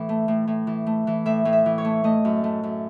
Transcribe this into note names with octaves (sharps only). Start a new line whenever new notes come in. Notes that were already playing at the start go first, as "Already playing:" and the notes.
Already playing: A2 E3
A3
A2
A2
E3
A3
E3
A2 E5
A2
E5
E3
C#5
A3
A3 D#5
F#2
A3
F#2